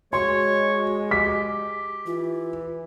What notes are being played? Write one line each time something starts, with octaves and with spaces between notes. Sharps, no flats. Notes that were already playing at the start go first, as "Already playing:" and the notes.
G#3 F#4 C#5 C6
G4 B6
E3 F4